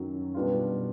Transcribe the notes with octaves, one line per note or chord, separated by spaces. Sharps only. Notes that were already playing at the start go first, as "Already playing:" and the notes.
Already playing: F#2 D#3 F#3
B2 G3 B3 D4 F4